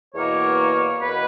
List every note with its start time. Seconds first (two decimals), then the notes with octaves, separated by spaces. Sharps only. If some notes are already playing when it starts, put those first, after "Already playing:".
0.15 E2 B2 A#3 C#5
1.01 E2 B2 A#3 B4